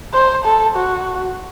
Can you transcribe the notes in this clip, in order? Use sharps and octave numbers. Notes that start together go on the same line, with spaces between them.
C5
A4
F#4